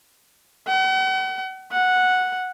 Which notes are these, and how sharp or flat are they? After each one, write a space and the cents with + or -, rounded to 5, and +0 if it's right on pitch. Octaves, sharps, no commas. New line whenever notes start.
F#5 +40
F#5 -5